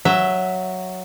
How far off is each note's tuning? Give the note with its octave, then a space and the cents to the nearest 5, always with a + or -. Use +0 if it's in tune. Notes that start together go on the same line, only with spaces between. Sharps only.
F#3 +0 E5 +5